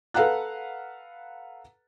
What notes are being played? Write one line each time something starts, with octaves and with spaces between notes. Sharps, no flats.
A4 B4 F5 F#5 A#5 F#6